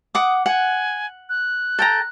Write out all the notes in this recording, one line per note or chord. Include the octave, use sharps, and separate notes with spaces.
F#5 D6 D#6
F#5 G#5
F#6
A4 G5 A#5